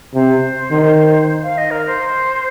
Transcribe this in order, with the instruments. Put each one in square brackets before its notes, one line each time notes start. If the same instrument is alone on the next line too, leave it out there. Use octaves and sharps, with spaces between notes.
[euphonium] C3 [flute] C5
[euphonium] D#3
[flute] F5
D#5
A#4
C5